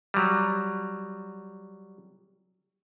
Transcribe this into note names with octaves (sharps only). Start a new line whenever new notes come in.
F#3 G3